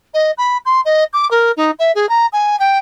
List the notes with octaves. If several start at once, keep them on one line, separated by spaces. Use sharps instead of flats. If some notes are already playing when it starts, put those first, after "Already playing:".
D#5
B5
C6
D#5
D6
A#4
D#4
E5
G#4
A#5
G#5
G5